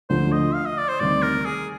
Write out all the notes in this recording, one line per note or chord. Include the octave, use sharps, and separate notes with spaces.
D2 D3 F3 C5
D#5
F5
D#5
D5
C5
D2 C3 D#3 G3 D5
A#4
G#4